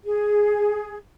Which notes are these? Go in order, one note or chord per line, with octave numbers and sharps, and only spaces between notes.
G#4